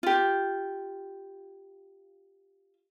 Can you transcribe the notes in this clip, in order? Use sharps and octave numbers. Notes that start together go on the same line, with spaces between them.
F4 G4